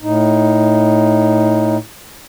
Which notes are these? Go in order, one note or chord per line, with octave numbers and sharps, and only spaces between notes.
A2 D#4